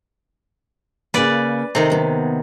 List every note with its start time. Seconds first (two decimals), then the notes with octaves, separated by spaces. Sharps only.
1.14 C#3 A#3 B4 D5
1.75 C3 D#3 A4 A#4 D#5
1.90 D#2 B3